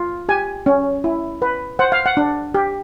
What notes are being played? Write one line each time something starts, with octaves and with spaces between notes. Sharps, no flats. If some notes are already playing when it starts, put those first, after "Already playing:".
Already playing: F4
G4 G#5
C#4
E4
B4
C5 F#5
F5
F#5
D4
G4